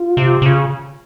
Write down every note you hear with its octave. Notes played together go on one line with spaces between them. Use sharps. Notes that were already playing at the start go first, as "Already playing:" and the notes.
Already playing: F4
C3
C3
C#3